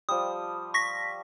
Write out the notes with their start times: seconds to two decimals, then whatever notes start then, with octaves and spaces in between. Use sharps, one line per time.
0.09 F3 G3 D#6
0.74 C#6 A#6 B6